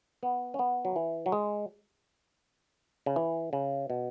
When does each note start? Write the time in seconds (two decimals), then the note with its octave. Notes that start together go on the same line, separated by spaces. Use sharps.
0.23 B3
0.54 C#4
0.59 B3
0.85 F#3
0.96 E3
1.26 F#3
1.32 G#3
3.06 C#3
3.16 E3
3.53 C#3
3.90 B2